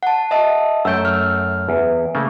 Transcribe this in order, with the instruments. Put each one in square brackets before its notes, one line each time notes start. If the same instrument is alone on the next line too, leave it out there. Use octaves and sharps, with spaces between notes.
[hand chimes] F#5 A5
D#5 E5 A5
[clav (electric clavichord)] F#2 A3 G5 [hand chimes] E6 G6
[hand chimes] F6
[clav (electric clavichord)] E2
C#3 A3 A#3